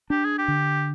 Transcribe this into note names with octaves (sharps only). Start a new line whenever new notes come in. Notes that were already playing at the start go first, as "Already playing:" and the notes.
D4 G4
G#4
G4
D3